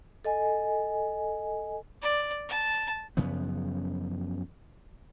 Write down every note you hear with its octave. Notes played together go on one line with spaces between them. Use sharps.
A4 D#5 G#5
D5
A5
F#2 C#3 F3 B3